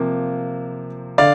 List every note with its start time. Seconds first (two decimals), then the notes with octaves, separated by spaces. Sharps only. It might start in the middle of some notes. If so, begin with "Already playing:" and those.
Already playing: C3 F3 A#3
1.18 D3 D5 F5